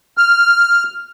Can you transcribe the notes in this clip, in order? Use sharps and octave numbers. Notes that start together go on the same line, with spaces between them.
F6